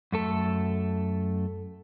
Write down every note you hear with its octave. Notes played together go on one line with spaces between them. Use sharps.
F#2 A3 A4